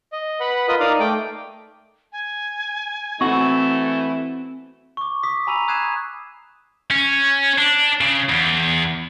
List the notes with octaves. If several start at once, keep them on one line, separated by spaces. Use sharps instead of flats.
D#5
B4 F#5 B5
F4 A#4 B4 D#5 D#6
D#4 A#4 D5 F5 D#6
A3 G5 D6
G#5
E3 A3 C4 E4 F#4 F#5 C#6
C#6 D6
D6 D#6 B6
G#5 A#5 B5 E6 D#7 F7
D#6 F#6 G#6 C7 D#7 E7
C#4
D4
C#3
E2